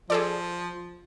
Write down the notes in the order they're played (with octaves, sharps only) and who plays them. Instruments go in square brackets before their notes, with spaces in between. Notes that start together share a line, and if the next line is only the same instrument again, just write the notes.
[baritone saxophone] F3 [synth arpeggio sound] G#4 A4 D5